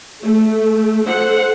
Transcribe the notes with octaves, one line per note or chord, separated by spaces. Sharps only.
A3
A4 C5 F#5